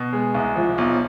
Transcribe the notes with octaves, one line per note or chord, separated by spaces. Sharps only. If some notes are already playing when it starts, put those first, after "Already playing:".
Already playing: B2
G#3
C2
F3
B1